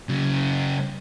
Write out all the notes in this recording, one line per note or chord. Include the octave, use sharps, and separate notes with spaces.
C#3 F#3